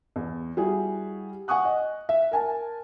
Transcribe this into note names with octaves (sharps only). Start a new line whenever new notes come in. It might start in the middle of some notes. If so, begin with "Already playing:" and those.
E2
G3 E4 F#4 G#4
F#5 G#5 C#6 D#6 F#6
D#5
E5
A#4 G#5 A5